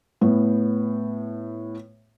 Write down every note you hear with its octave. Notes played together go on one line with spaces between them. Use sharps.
A2 B3